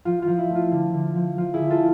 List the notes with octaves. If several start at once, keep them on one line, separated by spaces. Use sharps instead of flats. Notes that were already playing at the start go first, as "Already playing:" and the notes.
F3 F4
F4
F3
E4
A3
F4
D3
D3
F3
F3 F4
E4 G#4
D3
F4 A4